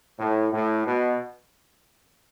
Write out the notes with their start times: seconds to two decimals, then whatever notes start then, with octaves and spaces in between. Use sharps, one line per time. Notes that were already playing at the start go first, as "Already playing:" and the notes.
0.19 A2
0.53 A2
0.87 B2